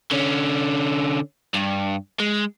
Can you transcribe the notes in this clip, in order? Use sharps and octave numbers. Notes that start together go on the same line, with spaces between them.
D3 C#4
G2
G#3